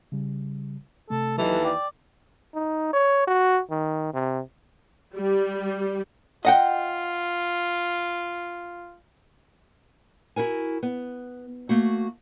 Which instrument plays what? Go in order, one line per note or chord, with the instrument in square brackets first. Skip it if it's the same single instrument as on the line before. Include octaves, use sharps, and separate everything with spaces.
[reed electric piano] C#3 G3
[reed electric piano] C3 A3 [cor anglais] A4
[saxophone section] D#2 E3 [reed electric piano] F#3 G4 D#5 [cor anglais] A4
[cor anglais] D5 [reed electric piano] G5
[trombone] D#4
C#5
F#4
D#3
C3
[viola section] G3
[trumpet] F4 [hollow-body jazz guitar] D#5 F#5 G5
[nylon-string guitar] E4 F#4 A#4 G#5
B3
A3 A#3 F#4